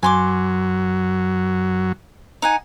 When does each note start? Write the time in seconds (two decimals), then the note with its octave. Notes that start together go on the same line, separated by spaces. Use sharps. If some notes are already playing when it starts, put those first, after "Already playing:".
0.03 F#2 F#3 G#5 C6 D6
2.42 D#4 F#5 G#5